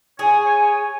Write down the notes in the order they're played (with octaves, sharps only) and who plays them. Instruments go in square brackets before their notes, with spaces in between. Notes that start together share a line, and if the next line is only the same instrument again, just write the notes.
[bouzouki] G#4 [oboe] C#5 [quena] G#5
[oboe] C#5